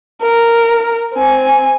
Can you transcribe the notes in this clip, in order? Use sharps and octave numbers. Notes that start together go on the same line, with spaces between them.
A#4
C4 G#5